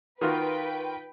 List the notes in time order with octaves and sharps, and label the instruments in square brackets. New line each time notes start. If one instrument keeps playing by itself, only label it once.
[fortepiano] D#3 F4 F#4 [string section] B4 G5